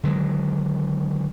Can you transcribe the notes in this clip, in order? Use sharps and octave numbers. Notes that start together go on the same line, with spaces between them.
D3 D#3 F#3 G#3